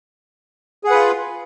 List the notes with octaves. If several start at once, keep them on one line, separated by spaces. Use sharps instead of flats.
F4 G#4 B4 F#5